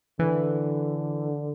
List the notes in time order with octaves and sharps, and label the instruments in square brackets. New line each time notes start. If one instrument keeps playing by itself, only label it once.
[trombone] D3 [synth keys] E3